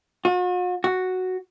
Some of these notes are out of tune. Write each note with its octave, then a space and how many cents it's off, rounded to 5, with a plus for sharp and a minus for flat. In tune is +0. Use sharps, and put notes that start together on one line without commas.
F#4 -45
F#4 +0